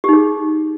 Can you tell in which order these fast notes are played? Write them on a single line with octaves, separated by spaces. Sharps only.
G4 D#4 G#4